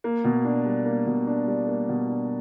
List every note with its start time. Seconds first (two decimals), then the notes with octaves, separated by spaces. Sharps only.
0.04 A#3
0.24 B2
0.45 D4
0.66 G3
0.86 A#3
1.07 B2
1.27 D4
1.47 G3
1.68 A#3
1.89 B2
2.08 D4